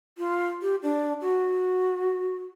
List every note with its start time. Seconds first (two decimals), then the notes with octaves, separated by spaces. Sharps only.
0.18 F4
0.62 G4
0.83 D4
1.21 F#4